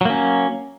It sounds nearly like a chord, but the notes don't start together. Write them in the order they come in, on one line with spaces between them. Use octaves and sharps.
F#3 A#3 C#4